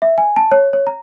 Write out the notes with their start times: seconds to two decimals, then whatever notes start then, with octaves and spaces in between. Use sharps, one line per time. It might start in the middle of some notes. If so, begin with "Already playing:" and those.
0.02 E5
0.18 G#5
0.36 A5
0.52 C#5
0.73 C#5
0.87 A#5